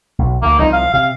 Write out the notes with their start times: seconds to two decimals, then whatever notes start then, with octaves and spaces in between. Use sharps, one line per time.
0.19 B1
0.42 D2 A#3
0.59 C2 D3 F3 D#4
0.73 F5
0.94 C3 F5